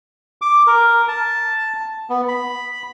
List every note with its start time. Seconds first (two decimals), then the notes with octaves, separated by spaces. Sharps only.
0.42 D6
0.67 A#4
1.08 A5
2.10 B3
2.28 B5